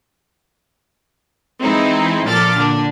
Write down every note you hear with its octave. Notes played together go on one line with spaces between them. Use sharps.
E3 G#3 C4 D#4 E4
A#2 F3 A4 D6 F6 A6
D3 D4